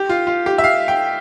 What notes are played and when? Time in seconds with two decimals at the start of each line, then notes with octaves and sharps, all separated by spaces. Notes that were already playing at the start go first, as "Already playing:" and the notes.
Already playing: G4
0.09 F4
0.27 F4
0.46 G4
0.58 E5
0.64 F5
0.88 G5